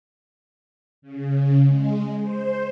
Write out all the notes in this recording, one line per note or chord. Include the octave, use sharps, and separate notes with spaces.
C#3
G#3
C5